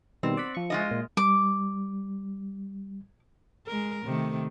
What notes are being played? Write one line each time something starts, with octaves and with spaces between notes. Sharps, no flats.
B2 D#3 G3 C4
D5 F#5 B5
F3 C#6
G#3 F4 D#5
A#2
G3 D6
G#3 A#4
C3 D#3 A3